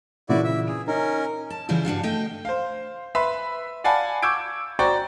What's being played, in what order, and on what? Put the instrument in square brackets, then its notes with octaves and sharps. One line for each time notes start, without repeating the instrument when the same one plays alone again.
[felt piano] A#2 C#3 E3 [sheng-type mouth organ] E4 F#4 D5
[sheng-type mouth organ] E5
G#4
[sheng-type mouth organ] C#4 A#4 [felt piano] D#4
[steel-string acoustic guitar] A5
C#3 E3 G3 E4 F4
G2 D4 F#4 F5
A3 D#5 G5
[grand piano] C5 F5
B4 E5 B5 C6
D5 F5 F#5 G#5 A5 B5
C#6 D6 E6 G6 G#6 D7
F#4 C5 D5 G5 A#5 C#6